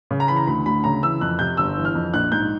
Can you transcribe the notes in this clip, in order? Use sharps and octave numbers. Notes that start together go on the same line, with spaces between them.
C#3
A#5
E3 B5
A#5
D2 B5
D2 B5
C#3 A#5
E3 E6
F2 F#6
C3 G6
G1 E6
E3
F6
F2
A#1 F#6
G#2 G6